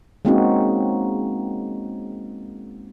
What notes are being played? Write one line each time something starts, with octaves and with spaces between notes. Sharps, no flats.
G#3 A#3 C4 C#4 D#4 F#4